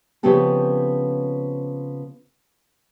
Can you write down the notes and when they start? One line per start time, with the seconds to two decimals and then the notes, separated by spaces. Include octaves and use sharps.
0.23 C#3 F3 B3 C4 G4 A4